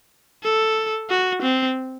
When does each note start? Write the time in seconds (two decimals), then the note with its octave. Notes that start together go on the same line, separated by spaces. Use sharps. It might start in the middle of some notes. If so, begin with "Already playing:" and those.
0.44 A4
1.10 F#4
1.42 C4